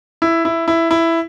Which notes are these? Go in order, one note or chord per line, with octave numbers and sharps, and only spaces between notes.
E4
E4
E4
E4